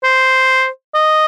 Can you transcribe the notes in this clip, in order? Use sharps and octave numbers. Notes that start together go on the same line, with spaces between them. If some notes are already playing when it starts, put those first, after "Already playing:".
C5
D#5